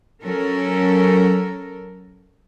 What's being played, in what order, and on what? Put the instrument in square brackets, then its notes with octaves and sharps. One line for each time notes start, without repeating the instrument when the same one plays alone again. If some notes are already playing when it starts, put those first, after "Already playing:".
[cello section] F#3 C#4 A4 A#4